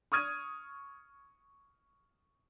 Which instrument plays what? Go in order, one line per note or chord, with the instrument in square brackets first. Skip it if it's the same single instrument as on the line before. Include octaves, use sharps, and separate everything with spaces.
[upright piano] C#6 D#6 F6 G#6 D#7